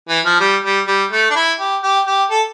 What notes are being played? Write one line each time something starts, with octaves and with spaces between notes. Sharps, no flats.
E3
F3
G3
G3
G3
A3
D4
E4
G4
G4
G4
A4